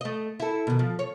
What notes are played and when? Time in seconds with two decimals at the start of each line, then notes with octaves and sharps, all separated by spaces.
0.01 A3 D#5
0.40 E4 A4
0.67 B2 D#3
0.79 F3
0.99 C#5